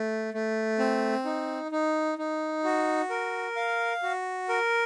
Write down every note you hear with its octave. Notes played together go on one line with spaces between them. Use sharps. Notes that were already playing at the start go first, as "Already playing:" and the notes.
Already playing: A3
A3
C4
D#4
D#4
D#4
F#4
A#4
F5
F#4
A#4